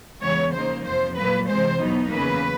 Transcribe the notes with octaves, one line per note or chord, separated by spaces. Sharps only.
E2 C#3 E3 G#3 B3 C#5
C#3 F3 A#3 D#4 C5
F2 C3 F3 C5
A#2 F#3 A#3 B4
C3 E3 G#3 C5
E2 B2 F#3 B3 D#4
E2 C#3 F#3 A#3 B4